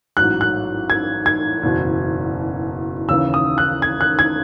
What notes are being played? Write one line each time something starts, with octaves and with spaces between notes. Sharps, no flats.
A1 G#2 F#3 F#6
F#6
G#6
G#6
F#1 E2 B2
D#2 C#3 E3 E6
D#6
F#6
G#6
F#6
G#6